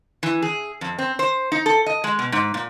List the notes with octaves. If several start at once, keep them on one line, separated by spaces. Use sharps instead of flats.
E3
G#4
F2
C4
C5
D#4
A4
D#5
G#3
B2
G#2
A#2